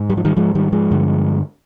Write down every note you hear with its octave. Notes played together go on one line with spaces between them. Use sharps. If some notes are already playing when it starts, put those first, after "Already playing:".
Already playing: G#2
G3
F3
D#3 G3
G#2 F3 G#3
D#3 G3
F3 G#3
G2 D3